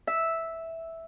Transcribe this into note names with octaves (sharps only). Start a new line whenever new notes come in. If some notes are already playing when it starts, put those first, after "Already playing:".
E5